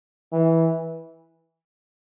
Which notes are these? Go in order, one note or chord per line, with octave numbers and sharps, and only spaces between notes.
E3